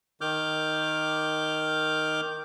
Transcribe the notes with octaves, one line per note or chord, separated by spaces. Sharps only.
D#3 D6 F6 G6